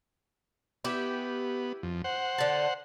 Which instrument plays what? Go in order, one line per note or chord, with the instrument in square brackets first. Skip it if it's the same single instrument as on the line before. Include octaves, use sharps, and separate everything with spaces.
[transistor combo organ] B3 [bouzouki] E4 G4
[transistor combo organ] F2
C5 F#5
[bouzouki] D3 A5